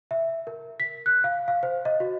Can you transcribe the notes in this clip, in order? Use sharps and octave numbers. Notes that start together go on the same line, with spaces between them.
E5
A#4
B6
F#6
F5
F5
C5
D#5
F#4